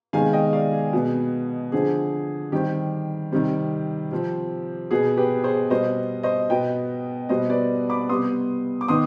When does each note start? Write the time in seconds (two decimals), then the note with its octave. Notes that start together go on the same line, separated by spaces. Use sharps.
0.13 C3 D#3 G#3 B3 F5 G#5
0.33 D#5 G5
0.53 D5 F5
0.73 G#4
0.93 B2 B3
1.72 D3 F3 C4 G#4
2.52 D#3 G3 C4 G4
3.32 C3 D#3 G3 C4
4.11 C3 F3 C4
4.91 B2 B3 G#4
5.17 G4 B4
5.44 G#4 C5
5.70 B2 G3 B3 C5 D#5
6.23 C5 D#5
6.50 B2 B3 D#5 G5
7.29 B2 G3 B3 C5 D#5
7.50 B4 D5
7.89 B5 D6
8.09 C3 G3 B3 C6 D#6
8.81 D6
8.88 D#3 B3 C6 D#6